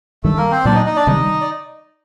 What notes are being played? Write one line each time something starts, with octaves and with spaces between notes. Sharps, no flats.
G2 D#3 G3 A3 A4
A#3 A#4
C4 C5
A#2 F#3 A#3 D4 D5
D#4 D#5
D#4 D#5
D4 D5
C3 D#3 G3 D#4 D#5
D5